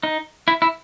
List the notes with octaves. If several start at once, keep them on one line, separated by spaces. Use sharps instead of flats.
D#4
E4
E4